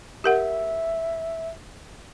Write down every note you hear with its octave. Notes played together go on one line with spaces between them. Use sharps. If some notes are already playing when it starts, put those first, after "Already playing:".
G4 A#4 E5 F#5